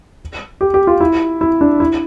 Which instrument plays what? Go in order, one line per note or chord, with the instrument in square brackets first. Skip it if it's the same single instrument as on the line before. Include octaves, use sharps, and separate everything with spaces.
[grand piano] G4
G4
F4
E4
E4
D4
E4